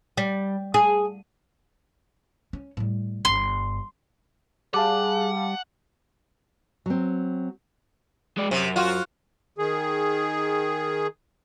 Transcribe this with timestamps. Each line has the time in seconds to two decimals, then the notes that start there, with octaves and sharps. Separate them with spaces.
0.17 G3
0.74 G#4
2.53 C#4
2.77 A2 G3
3.25 G1 G2 C6
4.74 G3 G#4 F5 F#5 A5 D6
6.86 F#3 C4
8.38 G#3 D5
8.51 F#2 C3
8.76 F4 F#4
9.58 D#3 G#4